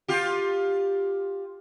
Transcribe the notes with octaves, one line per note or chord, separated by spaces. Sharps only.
F4 G4